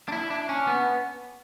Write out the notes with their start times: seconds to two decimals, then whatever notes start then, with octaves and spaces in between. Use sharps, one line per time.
0.08 D4
0.12 E4
0.30 D4
0.49 C#4
0.67 B3